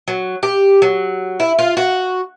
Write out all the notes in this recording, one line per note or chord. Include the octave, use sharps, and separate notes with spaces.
F#3
G4
F#3
E4
F4
F#4